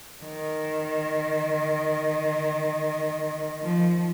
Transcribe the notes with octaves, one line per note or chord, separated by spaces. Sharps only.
D#3
F3